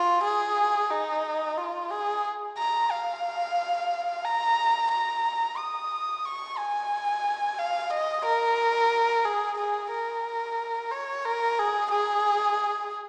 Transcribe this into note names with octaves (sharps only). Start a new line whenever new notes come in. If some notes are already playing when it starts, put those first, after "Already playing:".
Already playing: F4
G#4
D#4
F4
G#4
A#5
F5
A#5
A#5
D#6
C#6
G#5
F5
D#5
A#4
G#4
G#4
A#4
C#5
A#4
G#4
G#4